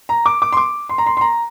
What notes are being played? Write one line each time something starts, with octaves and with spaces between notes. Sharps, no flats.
A#5
D6
D6
C6
D6
C6
A#5
C6
C6
A#5